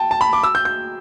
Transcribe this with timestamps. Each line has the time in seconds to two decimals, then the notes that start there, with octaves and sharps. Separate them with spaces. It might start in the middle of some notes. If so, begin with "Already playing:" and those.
Already playing: G5 A5
0.11 A5
0.21 B5
0.33 D6
0.43 E6
0.55 G6
0.65 G6